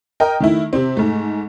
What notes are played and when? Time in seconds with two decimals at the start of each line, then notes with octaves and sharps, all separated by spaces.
0.20 A#4 D#5 G5
0.40 D#3 A3 E4
0.73 C3 C4
0.97 G#2 A3